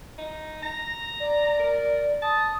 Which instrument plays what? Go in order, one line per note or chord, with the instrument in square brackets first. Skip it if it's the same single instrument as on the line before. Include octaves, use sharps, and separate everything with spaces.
[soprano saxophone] D#4
[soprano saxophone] A#5 [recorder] A#6
[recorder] D5
[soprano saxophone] A#4
[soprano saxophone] A5 [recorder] D#6